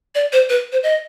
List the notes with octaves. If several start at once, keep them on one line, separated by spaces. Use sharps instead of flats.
D5
C5
B4
C5
D#5